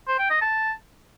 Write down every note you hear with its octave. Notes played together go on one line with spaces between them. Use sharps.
C5
G5
D#5
A5